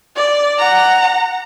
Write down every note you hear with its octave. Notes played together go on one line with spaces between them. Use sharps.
D5
F#5 A#5